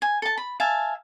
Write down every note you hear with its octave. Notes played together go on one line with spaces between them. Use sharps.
G#5
A4 A5
B5
E5 F5 G#5 A5